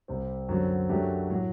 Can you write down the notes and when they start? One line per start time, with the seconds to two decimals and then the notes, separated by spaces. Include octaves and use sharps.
0.08 C2 C3 G3 C4
0.49 F#2 D3 F#3 C4
0.89 F#2 F#3 A3 D4 G4
1.30 A2 F#3